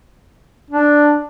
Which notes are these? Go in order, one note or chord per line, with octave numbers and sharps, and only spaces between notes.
D4